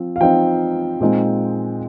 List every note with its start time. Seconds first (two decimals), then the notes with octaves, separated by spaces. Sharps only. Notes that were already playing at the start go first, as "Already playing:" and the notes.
Already playing: F3 C4
0.16 F5
0.21 F3 C4 D#4 G5
1.01 A#2 G#3 C4 D#4